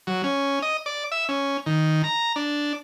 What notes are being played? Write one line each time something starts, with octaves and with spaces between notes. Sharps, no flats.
F#3
C#4
D#5
D5
E5
C#4
D#3
A#5
D4